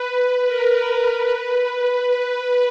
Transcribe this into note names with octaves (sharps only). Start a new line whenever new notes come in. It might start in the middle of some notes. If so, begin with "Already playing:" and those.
Already playing: B4
B4
A#4
B4